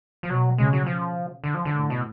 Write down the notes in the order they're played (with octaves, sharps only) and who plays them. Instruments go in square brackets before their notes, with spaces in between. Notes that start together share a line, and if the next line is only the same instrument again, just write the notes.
[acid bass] F3
[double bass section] B2 [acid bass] F#3
[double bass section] C#3 [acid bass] G#3
[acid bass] F#3
F3
D3
F3
D3
[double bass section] A2
[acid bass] B2